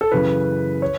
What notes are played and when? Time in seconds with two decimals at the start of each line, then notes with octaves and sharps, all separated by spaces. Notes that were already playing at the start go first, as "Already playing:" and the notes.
0.01 A4
0.12 F#2 C#3 E3 B4
0.82 C#5